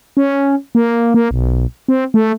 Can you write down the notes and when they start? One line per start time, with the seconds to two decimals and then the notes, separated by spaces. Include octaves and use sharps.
0.17 C#4
0.75 A#3
1.14 A#3
1.31 B1
1.88 C4
2.14 A3